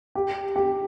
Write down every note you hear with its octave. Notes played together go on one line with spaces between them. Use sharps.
G4
G4